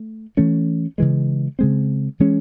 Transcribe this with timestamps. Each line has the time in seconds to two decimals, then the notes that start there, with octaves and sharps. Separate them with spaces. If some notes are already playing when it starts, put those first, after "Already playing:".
Already playing: A3
0.37 E3 A3 C#4
0.98 C#3 E3 G#3
1.59 C#3 G#3 C4
2.20 E3 G#3 C#4